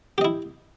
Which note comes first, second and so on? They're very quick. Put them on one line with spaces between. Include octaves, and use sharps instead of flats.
G4 D#5 E4